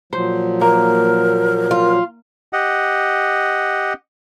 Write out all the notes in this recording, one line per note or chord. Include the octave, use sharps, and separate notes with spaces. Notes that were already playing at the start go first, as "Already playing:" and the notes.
A#2 F3 F#3 C5
A#3 A#4
F4
G4 D#5 F#5